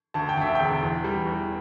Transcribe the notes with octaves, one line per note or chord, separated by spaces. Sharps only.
D2 A5
G5
D2 E5
E1 G5
E2
G3
E2